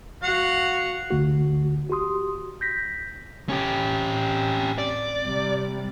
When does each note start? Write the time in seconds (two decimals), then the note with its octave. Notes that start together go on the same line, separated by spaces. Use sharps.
0.23 F#4 F5 F#5
1.11 G1 D2 D3 A3 F#4
1.90 F#4 G4 C6 D#6
2.61 G6 A#6 B6
3.49 A2 C4 C#4 G4
4.78 D5
5.24 C3 G3